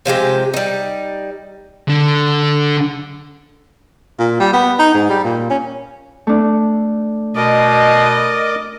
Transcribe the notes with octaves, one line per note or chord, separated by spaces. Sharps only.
C3 F3 G#3 G4
G3 D#4
D3
A#2
G3
B3
D#4
G#2
G3
A#2
C#4
A3 D4
B2 A#4 D5 D#5 D6